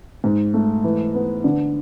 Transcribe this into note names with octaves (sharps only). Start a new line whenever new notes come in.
G#2
A3
E3
B3
D3